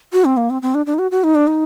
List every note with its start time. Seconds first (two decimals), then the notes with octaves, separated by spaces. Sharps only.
0.13 F#4
0.25 C4
0.37 A#3
0.50 C4
0.62 C4
0.74 D4
0.86 D4
0.94 D#4
0.99 F#4
1.11 F#4
1.24 D#4
1.35 D4
1.47 D#4